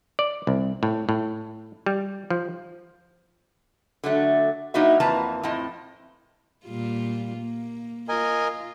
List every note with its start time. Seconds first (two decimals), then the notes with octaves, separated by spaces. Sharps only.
0.19 D5
0.47 C2
0.83 A2
1.09 A2
1.86 G3
2.30 F3
4.04 D3 F#3 A3
4.74 F#3 A#3 D#4 E4 F#4 E5
5.00 F2 E3 A#3 B4 A5 A#5
5.43 F2 A2 C4 E4 D#5 A5
6.66 A#2 G3 F4
7.38 A#3
8.09 F4 A#4 D#5 G#5